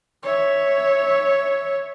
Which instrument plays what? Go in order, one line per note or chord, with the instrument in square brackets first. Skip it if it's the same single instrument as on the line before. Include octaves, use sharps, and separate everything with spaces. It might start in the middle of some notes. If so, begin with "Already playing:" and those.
[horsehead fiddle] C#5 E5